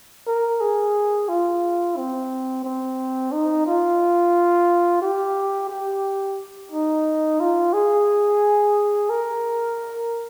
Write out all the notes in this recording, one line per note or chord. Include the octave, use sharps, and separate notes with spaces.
A#4
G#4
F4
C4
C4
D#4
F4
G4
G4
D#4
F4
G#4
A#4